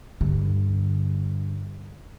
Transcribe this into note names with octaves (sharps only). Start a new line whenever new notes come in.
G2 D3